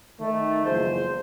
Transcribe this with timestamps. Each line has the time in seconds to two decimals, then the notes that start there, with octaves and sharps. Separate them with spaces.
0.21 D#3 A3
0.65 F#1 E2 F3 G#3 C5